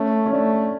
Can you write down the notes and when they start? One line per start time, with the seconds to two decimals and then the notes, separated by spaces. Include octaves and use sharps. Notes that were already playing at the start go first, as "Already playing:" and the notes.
Already playing: A3 C#4
0.26 C#4
0.32 A3 D4